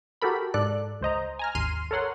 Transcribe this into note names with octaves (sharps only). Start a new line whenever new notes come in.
F#4 G4 A4 A#4 B5
G#2 A4 D5 F#6
C#2 C5 D#5 A#5
G#5 A#5 F6
G#1 D#2 C6 F6 C7 D#7
A4 A#4 C#5 F#5 C6